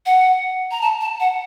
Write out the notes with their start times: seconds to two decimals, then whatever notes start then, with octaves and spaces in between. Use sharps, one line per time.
0.06 F#5
0.71 A#5
0.82 A5
1.01 A5
1.20 F#5